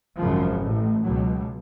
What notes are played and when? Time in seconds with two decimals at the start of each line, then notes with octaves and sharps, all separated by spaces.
0.17 G#1 F#2 C#3 F3
0.60 A1 A2
1.04 C#2 B2 F#3